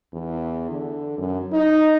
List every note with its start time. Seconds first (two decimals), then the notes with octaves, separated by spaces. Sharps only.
0.13 E2
0.70 D3
1.18 F#2
1.52 D#4